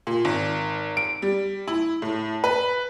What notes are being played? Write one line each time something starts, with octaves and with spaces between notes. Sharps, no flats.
A#2
G#1
D7
G3
E4
A2
B4